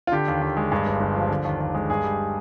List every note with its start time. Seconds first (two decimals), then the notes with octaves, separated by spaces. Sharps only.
0.07 F4
0.12 D3 G4
0.28 D#2
0.42 D#2
0.57 G#3
0.72 G2
0.86 G1
1.01 G1
1.16 F3
1.30 D3
1.45 D#2
1.60 D#2
1.75 G#3
1.90 G2 G#4
2.04 G3